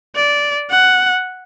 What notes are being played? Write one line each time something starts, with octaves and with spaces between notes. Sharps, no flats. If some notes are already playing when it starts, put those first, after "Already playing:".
D5
F#5